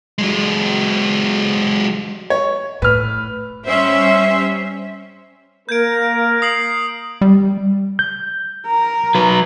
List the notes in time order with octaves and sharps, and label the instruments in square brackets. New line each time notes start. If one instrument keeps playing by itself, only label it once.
[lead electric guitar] F#3 G#3
[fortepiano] C#5
[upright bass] A2 [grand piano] B4 F6
[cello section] G3 C#4 C5 E5
[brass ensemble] A#3 A#4 [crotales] G6 G#6 D7
[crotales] D#6 C7 F#7
[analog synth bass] G3
[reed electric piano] G6
[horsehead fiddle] A#4
[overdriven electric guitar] F#3 B4